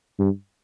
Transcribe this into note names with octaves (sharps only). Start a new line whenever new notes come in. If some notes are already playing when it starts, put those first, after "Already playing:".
G2